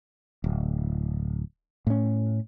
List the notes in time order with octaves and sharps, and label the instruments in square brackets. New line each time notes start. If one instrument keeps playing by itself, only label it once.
[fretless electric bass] D1
A2 C#4